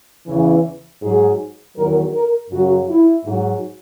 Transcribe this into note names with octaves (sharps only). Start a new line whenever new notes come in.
E2 C#3 E3
G#2 F#3 G#4
E2 D#3 F#3 A#4
A#4
F#2 C#3 F#3 F#4
E4
G#2 F#3